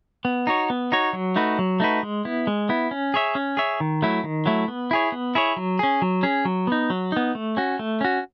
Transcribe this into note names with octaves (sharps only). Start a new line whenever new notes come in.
B3
D#4 F#4 C#5
B3
D#4 F#4 C#5
F#3
A3 D#4 F#4 B4
F#3
A3 D#4 F#4 B4
G#3
B3 E4
G#3
B3 E4
C#4
G#4 C#5 E5
C#4
G#4 C#5 E5
D#3
F#3 A3 E4
D#3
F#3 A3 E4
B3
E4 G#4 C#5
B3
E4 G#4 C#5
F#3
C#4 G#4
F#3
C#4 G#4
F#3
B3 D#4
F#3
B3 D#4
A3
C#4 F#4
A3
C#4 F#4